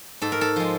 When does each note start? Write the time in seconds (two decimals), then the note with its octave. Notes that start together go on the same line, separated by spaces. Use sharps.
0.22 G#2 A4
0.32 A#4
0.41 A4
0.56 F3 G#3